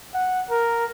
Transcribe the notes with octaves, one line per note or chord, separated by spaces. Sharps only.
F#5
A#4